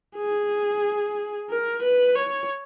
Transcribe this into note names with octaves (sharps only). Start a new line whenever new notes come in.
G#4
A#4
B4
C#5